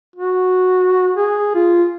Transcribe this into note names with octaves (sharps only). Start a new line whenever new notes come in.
F#4
G#4
F4